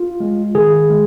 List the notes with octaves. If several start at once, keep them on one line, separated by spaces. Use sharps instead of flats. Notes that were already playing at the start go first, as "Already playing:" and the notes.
Already playing: F4
G#3
D#3 G#4
G#3